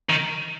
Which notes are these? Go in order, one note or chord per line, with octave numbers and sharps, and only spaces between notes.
D#3